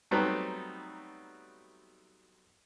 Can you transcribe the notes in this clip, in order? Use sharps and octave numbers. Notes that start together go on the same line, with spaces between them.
F#3 G3 A3 B3 C4 D#4